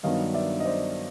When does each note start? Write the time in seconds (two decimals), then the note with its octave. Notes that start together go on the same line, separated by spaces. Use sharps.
0.03 G2 D#3 F#3 B3 D4 D#5 F5
0.34 D5 E5
0.60 D#5
0.65 C5 D5